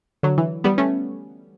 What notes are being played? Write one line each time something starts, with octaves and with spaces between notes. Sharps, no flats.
D3 F#3
E3
G3 B3
A3 C#4